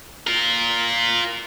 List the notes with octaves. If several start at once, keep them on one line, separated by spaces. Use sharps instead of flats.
F4 A#4